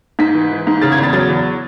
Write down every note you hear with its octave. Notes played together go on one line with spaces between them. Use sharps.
G#2 B6
E3
E3
G#2
C#3 A6
G#6
E2 A6
F#3 A6
E2